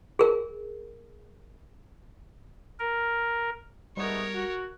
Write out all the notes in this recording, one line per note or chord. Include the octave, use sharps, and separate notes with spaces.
G#4 A#4
A#4
G#2 G3 A3 B3 A#4 C#5
F#4